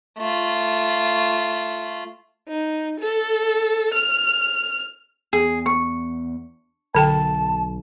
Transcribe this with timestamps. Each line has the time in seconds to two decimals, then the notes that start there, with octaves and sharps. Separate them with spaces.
0.18 A3 F4
2.49 D#4
3.00 A4
3.94 F6
5.33 E2 G#4
5.66 C#6
6.95 B1 D3 A4 G5 A5